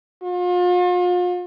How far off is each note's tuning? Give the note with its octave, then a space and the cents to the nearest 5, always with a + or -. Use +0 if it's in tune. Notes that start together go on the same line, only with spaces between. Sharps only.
F4 +40